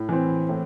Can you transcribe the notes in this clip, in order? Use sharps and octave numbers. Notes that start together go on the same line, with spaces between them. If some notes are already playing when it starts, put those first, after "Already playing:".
Already playing: A2
E3 C4
A2